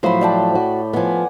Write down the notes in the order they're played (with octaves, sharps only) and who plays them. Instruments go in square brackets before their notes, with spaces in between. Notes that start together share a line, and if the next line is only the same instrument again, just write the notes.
[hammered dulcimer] A2 B5 [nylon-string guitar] F3 F#3 C5
[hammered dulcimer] D5 G5 A5
[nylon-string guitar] F#4
[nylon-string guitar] F3 B3 [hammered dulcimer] F#5 G#5